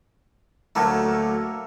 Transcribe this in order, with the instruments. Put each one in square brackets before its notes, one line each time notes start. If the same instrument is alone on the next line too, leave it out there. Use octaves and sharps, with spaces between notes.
[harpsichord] D2 F#3 A3 [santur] A#3 A4 A#4